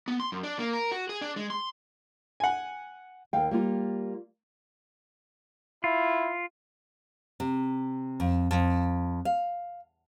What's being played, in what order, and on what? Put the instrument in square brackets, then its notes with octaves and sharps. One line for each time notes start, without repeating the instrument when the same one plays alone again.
[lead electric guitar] B3
C6
F#2
D4
A#3
A#4
F#4
G#4
D4
G#3
C6
[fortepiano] F#5 G#5
[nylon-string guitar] D#2 F5 G5
G3 A#3 F4
[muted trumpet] E4 [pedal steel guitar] F4
[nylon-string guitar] C3
F2
F2
F5